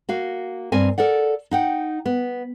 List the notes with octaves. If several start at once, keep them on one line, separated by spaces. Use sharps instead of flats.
A#3 F#4 F5
G2 A#3 C4 A#4 G#5
A4 A#4 D5 F#5
D#4 F#5 G5
B3